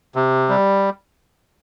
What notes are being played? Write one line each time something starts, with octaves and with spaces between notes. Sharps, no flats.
C3
G3